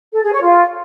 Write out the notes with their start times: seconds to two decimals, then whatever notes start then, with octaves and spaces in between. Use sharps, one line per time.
0.13 A4
0.23 G#4
0.33 C#5
0.42 F4